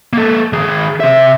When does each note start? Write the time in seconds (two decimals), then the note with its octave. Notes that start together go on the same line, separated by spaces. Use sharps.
0.13 A#3 A4
0.53 D#3 G#4
1.00 C3 E5